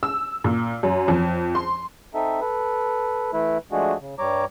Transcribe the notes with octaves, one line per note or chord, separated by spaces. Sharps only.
E6
A#2
F#2
F2
C6
C4 D#4 A4 E5
A4 B4
E3 A3 E4 B4
F3 G#3 A3 D4 F#4 G#4
C#3
G2 G3 C#5 A#5 D6